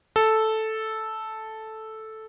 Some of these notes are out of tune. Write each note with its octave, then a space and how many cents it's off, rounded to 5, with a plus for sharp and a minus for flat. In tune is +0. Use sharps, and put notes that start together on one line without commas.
A4 -5